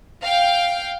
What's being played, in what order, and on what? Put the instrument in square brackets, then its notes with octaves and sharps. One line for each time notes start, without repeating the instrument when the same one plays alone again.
[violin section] F5 G5